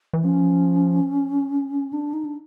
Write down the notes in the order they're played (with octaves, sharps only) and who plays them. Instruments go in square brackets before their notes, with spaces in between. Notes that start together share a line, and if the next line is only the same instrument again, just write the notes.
[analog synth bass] E3
[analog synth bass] F3 [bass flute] C#4
[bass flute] D4
D#4
D4